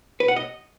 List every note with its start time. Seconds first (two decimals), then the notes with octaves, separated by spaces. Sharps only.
0.20 B4
0.28 F#5
0.36 D#5